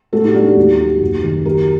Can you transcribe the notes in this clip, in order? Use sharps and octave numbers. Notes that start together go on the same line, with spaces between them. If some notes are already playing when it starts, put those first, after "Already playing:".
A2 F#4 A4
D#4 G4
F#3 D4 F#4
D#4 G4
D#2
F#3
F#1
D#3
F#3 G4 A#4